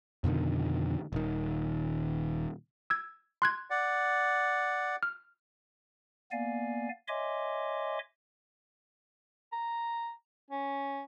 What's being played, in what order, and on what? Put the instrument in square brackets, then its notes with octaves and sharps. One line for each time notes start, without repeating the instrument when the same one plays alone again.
[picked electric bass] F2 B2 D3 D#3
D#1 D#3
[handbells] E6 G#6
C6 F#6 G#6
[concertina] D5 F#5
[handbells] F6
[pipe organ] A#3 B3 D5 F5 G#5
C#5 D#5 E5 G#5 C6 D6
[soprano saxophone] A#5
C#4